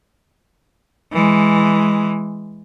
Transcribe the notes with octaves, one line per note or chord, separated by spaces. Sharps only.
E3 G#3